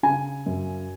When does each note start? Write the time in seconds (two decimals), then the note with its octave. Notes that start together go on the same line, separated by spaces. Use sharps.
0.03 C#3 G#5
0.46 F#2